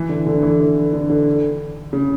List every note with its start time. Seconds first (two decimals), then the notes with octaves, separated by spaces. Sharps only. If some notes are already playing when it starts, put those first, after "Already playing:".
Already playing: E3
0.09 D3
0.26 D3
0.43 E3
0.60 D3
0.93 D3
1.10 D3
1.93 C#3